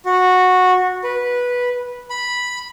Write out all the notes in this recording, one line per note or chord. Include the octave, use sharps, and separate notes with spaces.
F#4
B4
B5